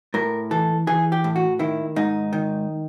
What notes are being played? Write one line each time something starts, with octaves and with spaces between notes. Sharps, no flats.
A2 A#4
E3 A4
E3 G#4
G4
A2
F#4
D#3 E4
G#2 D#4
D#3